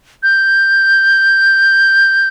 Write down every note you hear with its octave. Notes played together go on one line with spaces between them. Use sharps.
G6